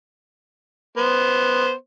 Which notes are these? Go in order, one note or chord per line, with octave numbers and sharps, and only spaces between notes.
B3 C5